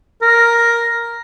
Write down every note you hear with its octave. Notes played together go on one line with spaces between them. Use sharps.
A#4